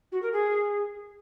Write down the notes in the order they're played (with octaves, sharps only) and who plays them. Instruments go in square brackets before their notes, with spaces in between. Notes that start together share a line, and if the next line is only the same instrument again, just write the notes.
[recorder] F#4
A#4
G#4